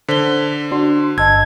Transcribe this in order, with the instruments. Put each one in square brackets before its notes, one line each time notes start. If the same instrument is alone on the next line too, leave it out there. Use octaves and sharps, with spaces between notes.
[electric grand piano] D3 [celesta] C5 G7 [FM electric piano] B6
[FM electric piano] D4 F#4 C6
[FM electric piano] G1 [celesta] D#5 A5 E6 [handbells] G#6